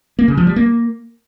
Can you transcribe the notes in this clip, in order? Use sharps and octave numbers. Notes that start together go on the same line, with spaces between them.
A#3
C#3
F3
G3
A#3